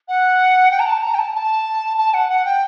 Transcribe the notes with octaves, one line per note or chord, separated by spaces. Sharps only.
F#5
G5
A#5
A5
A#5
G5
A5
A5
A5
F#5
F#5
G5